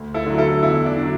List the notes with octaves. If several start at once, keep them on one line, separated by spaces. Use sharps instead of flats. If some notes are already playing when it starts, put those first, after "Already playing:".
Already playing: D2
E4 A4
D3 F#3
E4 A4
E2 E4
D4
D3 F#3